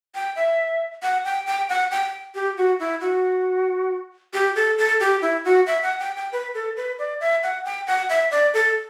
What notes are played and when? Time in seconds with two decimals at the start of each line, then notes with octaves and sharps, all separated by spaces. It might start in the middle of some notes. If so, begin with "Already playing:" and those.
0.15 G5
0.36 E5
1.02 F#5
1.25 G5
1.46 G5
1.69 F#5
1.91 G5
2.35 G4
2.57 F#4
2.80 E4
3.01 F#4
4.34 G4
4.56 A4
4.78 A4
5.00 G4
5.22 E4
5.45 F#4
5.67 E5
5.83 F#5
6.00 G5
6.16 G5
6.32 B4
6.55 A4
6.76 B4
6.99 D5
7.20 E5
7.43 F#5
7.65 G5
7.87 F#5
8.09 E5
8.31 D5
8.54 A4